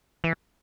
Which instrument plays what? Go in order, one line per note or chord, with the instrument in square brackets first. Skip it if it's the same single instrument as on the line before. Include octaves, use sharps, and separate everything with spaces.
[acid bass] E3